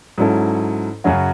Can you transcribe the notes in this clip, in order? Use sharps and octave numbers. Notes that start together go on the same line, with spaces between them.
G#2 F#3 C#4 E4 A4
F#2 C#3 F#3 C#4 F#4